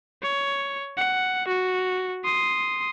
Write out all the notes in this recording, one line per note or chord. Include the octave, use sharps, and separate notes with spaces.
C#5
F#5
F#4
C6 D#6